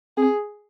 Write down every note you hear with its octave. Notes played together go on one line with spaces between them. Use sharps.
C4 G#4